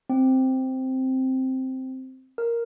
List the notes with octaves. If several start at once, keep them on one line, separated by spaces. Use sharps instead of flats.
C4
A#4